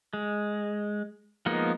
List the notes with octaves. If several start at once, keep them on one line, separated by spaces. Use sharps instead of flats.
G#3
F3 G#3 A#3 B3 D#4